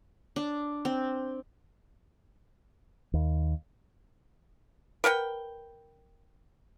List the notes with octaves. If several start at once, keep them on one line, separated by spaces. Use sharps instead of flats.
D4
C4
D#2
A#4 B4 F#5 G5